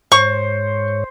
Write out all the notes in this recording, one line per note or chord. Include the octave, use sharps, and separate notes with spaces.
G#2 C5 C#5 C#6